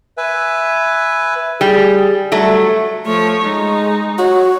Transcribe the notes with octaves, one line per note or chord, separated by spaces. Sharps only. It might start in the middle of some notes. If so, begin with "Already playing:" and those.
B4 E5 G#5
G3 G#4
F#3 G3 A3
F3 A3 C#5
G#3 D#4
F#4 C#5